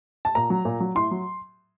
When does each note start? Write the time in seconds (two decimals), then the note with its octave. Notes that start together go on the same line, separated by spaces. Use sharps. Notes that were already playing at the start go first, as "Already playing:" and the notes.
0.25 A5
0.35 A#2 A#5
0.50 F#3
0.65 A#2
0.80 F#3
0.95 A2 C6
1.11 F#3